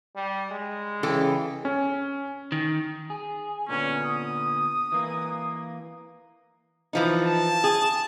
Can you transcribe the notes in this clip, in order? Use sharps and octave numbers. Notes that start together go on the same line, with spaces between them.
G3
G#3
C#3 E3 A4 G5
C#4
D#3
G#4
A#2 D3 B3 C#4
D#6
E3 A#3
E3 F3 D#4
A5
G#4